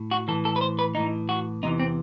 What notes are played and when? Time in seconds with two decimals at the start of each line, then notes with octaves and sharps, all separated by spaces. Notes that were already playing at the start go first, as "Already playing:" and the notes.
Already playing: A2
0.11 F#4
0.28 E3 A4
0.32 A2
0.45 A4
0.56 B4
0.61 C5
0.79 B4
0.95 A2 E3 D#4
1.29 F#4
1.63 E2 C3 E3 D#4
1.80 C4